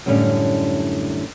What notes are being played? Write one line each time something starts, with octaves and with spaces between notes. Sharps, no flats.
F#2 A2 D3 G3 C#4